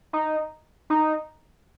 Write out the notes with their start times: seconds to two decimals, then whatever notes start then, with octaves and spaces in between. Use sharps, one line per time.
0.13 D#4
0.90 D#4